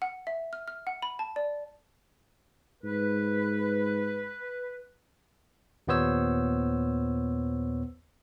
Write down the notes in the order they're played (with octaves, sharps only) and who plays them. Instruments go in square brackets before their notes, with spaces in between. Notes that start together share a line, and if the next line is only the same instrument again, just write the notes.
[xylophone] F#5
E5
F6
F6
F#5
B5
A5
D5
[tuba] G#2 [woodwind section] B4
[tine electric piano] D#2 A#2 B3 C5 C#5 E6